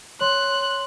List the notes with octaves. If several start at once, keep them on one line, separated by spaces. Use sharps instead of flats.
C#5 C6 F#6